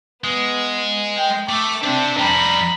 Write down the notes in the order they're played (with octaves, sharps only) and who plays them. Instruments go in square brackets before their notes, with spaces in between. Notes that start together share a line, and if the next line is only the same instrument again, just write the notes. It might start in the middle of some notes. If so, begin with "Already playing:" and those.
[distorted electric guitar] G#3 [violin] B3
[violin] G5
[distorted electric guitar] A3 [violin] D6
[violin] C4 D4 [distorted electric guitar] G4 E5
[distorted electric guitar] F2 G3 [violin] A#5 B5